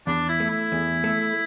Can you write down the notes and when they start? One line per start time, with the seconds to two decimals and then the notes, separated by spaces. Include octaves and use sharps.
0.07 E2 D4
0.29 E4
0.40 A3
0.50 E4
0.72 E2
1.04 A3